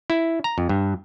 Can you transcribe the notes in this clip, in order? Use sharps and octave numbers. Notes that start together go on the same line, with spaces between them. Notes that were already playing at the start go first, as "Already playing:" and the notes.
E4
A#5
F2
G2